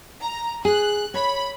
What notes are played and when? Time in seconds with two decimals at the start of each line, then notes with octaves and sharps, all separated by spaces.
0.21 A#5
0.65 G#4 F#6
1.14 C#5 B5